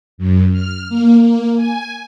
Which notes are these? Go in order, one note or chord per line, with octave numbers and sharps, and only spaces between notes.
F#2
F6
A#3
A#3
G#5